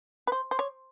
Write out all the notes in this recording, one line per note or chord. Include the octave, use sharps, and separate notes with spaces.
B4
C5
C5
C#5